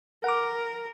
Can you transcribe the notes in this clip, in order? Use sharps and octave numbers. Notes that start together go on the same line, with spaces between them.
A#4 F#5 D6